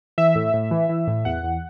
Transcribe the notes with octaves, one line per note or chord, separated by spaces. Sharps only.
E3 E5
A2
A2
E3
E3
A2
E2 F#5
E2